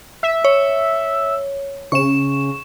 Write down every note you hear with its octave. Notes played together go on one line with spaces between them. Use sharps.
E5
C#5
C#3 C#6 E7